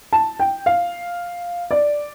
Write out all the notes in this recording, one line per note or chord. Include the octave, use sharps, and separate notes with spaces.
A5
G5
F5
D5